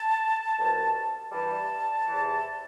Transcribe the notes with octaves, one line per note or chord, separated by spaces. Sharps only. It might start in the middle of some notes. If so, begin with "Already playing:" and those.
Already playing: A5
C2 B2 G3
G2 E3 G3 A5
E2 C3 E3